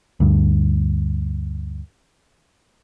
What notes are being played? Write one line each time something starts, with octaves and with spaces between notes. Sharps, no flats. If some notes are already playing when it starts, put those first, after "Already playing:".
D2 G2